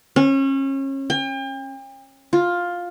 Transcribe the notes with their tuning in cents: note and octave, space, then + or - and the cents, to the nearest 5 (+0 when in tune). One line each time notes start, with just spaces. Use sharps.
C#4 -30
G5 +40
F4 +10